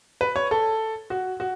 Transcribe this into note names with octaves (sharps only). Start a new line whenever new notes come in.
B4
C#5
A4
F#4
F#4